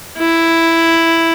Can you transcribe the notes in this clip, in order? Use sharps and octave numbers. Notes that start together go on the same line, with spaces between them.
E4